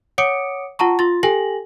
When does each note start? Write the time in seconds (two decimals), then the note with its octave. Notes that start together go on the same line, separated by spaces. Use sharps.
0.18 C#5 F#5 D6 D#6 C#7 D7
0.79 F4 F#5 A5 A#5 C#6
0.99 F4 C6 A6
1.23 G4 A4 G5 G#5 A#6 F#7